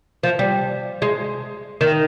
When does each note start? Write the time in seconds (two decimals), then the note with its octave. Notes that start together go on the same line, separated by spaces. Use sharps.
0.23 F3
0.39 G3
1.02 G#3
1.81 D#3